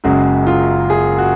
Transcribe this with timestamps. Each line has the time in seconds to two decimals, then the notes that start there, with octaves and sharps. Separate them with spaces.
0.04 F#1 F#2 C#3 G#3 F#4
0.47 F4
0.90 G#4
1.18 F#4